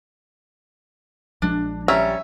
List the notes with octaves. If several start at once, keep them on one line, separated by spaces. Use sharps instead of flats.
A#1 F3 G#3 D4
G3 C4 C#4 E5 A#5